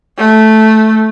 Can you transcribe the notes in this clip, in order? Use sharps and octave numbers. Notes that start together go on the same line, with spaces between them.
A3